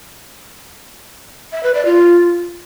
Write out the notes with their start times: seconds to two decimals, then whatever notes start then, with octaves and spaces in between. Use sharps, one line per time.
1.52 E5
1.63 B4
1.74 D5
1.85 F4